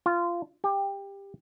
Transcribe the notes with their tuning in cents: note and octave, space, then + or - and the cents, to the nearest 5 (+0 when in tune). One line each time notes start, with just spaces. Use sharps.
F4 -15
G4 +15